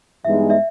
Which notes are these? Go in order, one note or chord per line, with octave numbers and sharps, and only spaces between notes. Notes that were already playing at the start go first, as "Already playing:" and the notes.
G2 E3 G#3 B3 D#4 E5
D5 E5